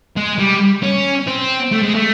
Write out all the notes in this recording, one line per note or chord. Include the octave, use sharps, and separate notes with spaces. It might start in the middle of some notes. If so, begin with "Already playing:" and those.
G#3
G3
C#4
C4
A3
G#3
A3